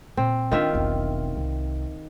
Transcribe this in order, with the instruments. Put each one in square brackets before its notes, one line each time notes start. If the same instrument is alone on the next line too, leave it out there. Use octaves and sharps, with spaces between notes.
[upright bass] A#2 [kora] C4
[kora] D#3 F4 E5 [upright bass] D4 D#4
[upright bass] E1 B1
C2